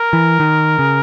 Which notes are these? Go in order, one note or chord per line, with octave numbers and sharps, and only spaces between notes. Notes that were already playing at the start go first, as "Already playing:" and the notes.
Already playing: A#4
E3
D#3
C#3